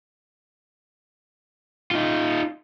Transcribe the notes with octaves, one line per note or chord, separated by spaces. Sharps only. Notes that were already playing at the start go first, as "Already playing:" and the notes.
D#4 F4